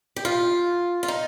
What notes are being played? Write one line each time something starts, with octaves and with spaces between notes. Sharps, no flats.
G4
F4
F4
D#4